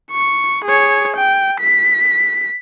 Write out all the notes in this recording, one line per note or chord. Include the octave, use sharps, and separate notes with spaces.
C#6
G#4 C#5
G5
B6